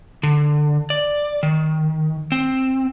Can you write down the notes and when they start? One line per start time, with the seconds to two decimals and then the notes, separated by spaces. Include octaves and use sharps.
0.23 D3
0.90 D5
1.43 D#3
2.32 C4